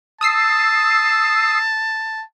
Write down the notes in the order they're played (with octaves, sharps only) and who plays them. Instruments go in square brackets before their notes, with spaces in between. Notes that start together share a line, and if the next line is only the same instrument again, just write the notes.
[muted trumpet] A5 [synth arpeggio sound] D#6 E6 C7